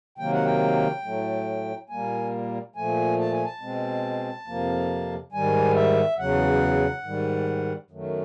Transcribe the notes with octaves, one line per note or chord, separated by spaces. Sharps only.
C3 D#3 F#3 A#3 G5
F#5
G5
A2 F#3 A3
A#2 G3 A#3 G#5
A#2 F3 A3 G#5
A5
G#5
A5
B2 G#3 C4
F2 C3 F3 A#3
G#2 D#3 G3 G#5
E5
E2 C#3 F#3 F#5
G#2 D#3 G3
F#2 D#3 F#3 A3